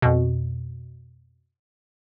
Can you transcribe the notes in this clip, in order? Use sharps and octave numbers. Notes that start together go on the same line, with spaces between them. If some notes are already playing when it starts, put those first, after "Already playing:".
F2 B2